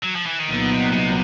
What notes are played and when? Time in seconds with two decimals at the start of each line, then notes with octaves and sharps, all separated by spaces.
0.03 F#3
0.15 F3
0.26 E3
0.39 D#3
0.50 C2 A#2 D3 F#3 B3 D#4
0.71 C3
0.92 C3